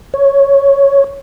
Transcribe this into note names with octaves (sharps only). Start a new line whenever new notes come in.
C#5